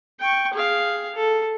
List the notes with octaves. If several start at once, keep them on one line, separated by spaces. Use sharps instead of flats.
G5 C#6
G#4 F5
A4